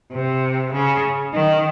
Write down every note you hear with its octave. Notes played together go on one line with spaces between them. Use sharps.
C3
C#3
D#3